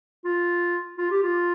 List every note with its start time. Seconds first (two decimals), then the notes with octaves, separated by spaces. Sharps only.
0.25 F4
0.98 F4
1.11 G4
1.22 F4